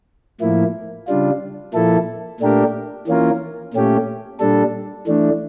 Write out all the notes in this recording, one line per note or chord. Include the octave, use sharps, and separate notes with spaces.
A2 F3 A#3 E4
C#3 G3 D4 F4
A#2 F3 A#3 E4 A4
A#2 A3 D4 G4 A#4
E3 A#3 C#4 F4 A#4
A#2 A3 C#4 G4
A#2 G3 D4 A4
E3 A3 D4